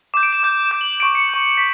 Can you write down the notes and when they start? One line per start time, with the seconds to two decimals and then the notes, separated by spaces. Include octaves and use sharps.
0.14 D6 G6 E7
0.23 D7
0.33 E7
0.43 D6 G6
0.71 D6 G6 E7
0.81 F#7
1.00 C#6 G6 D7
1.15 C#7
1.29 C#6 G6
1.57 C#6 B6